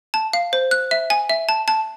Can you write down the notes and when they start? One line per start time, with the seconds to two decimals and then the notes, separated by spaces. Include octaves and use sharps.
0.14 A5
0.33 F5
0.53 C5
0.71 F#6
0.91 E5
1.10 G#5
1.29 E5
1.49 A5
1.68 A5